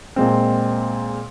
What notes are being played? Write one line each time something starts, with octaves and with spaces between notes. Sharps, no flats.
A#2 G#3 C4